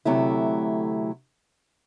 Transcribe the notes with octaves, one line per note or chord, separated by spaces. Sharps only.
D2 C3 F#3 A3 E4